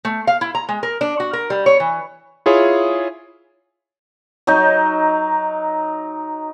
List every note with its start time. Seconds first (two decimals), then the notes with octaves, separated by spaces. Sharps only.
0.05 A3
0.27 F5
0.41 E4
0.55 A#5
0.69 G#3
0.83 A#4
1.01 D4
1.20 F#4
1.33 A#4
1.50 G3
1.66 C#5
1.80 E3
2.46 E4 F4 G#4 C#5
4.47 F#3 D#4